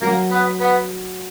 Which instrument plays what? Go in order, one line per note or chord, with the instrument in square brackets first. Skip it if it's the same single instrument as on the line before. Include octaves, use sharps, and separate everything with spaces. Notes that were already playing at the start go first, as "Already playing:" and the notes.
[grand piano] F#3 [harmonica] A#3 A#4
[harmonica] B3 B4
B3 B4